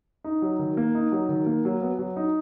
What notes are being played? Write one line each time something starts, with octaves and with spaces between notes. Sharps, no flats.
D#4
F#3
D#3
A#3
D#4
F#3
D#3
A#3
F#3
B3
F#3
D#4